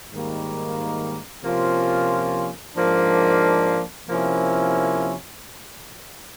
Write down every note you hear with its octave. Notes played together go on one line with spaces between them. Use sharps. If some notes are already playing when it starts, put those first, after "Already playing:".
G#2 D#3 G3 A#3
C3 F3 A#3 C#4 F4
G#2 F3 A#3 D4
C3 F3 A#3 C#4 E4